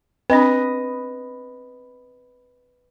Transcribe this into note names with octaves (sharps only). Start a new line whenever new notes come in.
C4 D4 B4 D#5